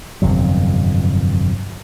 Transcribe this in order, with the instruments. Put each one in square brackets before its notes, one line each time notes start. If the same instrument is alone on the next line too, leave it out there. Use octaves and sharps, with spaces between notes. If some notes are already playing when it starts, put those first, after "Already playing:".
[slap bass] G1 F2 C3 F#3